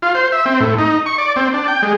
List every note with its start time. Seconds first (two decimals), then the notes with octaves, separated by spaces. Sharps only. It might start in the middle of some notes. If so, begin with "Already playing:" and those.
0.02 F4
0.15 C5
0.32 E5
0.46 C4
0.60 A2
0.78 D#4
1.06 C#6
1.18 D5
1.36 C4
1.54 D4
1.68 G5
1.82 G#3